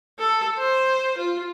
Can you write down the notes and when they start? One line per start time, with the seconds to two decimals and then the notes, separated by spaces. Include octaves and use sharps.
0.19 A4
0.58 C5
1.18 F4